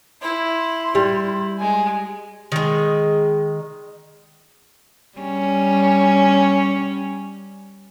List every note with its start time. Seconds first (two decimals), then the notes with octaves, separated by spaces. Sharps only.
0.22 E4 C6
0.95 G3 E4
1.59 G#3 G#5
2.52 D#3 G#3
5.19 G3 C#4